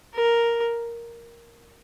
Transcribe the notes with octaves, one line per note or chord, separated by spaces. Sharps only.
A#4